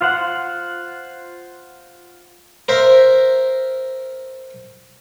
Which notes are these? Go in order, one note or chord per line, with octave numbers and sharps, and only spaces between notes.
F4 C5 F#5
A#4 C5 E5